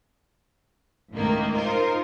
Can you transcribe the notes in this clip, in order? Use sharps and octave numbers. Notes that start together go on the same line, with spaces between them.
C#2 A2 D#3 A#3
D#4 F4 A#4 C5